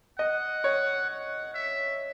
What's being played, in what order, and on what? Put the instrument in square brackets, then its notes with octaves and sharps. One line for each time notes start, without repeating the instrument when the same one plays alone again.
[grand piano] D#5 [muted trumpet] F#5
[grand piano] C#5
[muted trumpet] F#5
E5